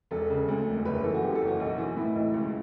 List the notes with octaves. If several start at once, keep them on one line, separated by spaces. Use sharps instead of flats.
E1 A4
C#3
D2
E1
F#1 B4
E3 A4
F#4
F#2 G4
A4
F#1
F#4
B1
E3
A2 E4
B1
C#2